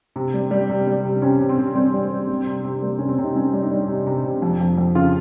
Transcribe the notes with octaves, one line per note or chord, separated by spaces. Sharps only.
C3
G3
G3
C3
G3
C3
C3 C#4
C3
C4
C3
G3 C4
G3
G3
G3
C3
C3
G3 A#3
C3 C#4
C4
C3
D#4
G3 C#4
G3
D#4
G3
C3
C3
C3
F2
F2
F2
C#3 F4